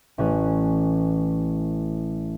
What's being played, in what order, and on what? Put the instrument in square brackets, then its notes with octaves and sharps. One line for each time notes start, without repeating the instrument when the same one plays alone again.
[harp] A1 E3 C#4 F#6